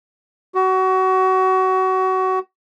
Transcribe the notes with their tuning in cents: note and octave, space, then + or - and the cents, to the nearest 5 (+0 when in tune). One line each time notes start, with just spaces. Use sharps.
F#4 +25